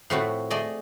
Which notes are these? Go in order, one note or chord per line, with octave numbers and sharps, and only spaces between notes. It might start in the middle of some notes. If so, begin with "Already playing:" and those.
A2 F3 A3 C4 F#4
A3 G#4 D5 D#5